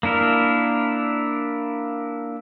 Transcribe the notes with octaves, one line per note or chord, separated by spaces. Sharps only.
A#3 D4 E4 A#4